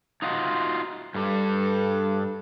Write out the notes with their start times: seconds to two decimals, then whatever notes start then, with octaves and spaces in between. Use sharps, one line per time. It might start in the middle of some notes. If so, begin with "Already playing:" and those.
0.22 D#4 F4 F#4
1.15 G2 G3 A4